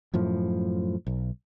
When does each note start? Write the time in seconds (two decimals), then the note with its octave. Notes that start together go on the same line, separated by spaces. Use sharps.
0.14 F#2 A2 F3
1.07 B1